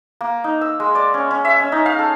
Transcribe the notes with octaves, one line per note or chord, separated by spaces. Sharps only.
A#3
D#4
E6
G#3
D5
C#4
C#4
E5
C#4
D#4
F5
A4